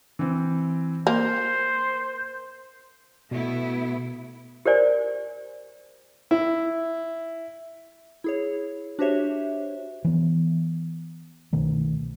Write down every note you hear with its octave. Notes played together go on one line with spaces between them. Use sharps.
E3 C4
A#3 C5 G6
B2 A3 B3 E4
G4 A#4 C5 D5 G#5
E4
E4 G#4 C#5
D4 F#4 G4 C5 C#5 E5
E3 B3
C2 B2 D#3 A3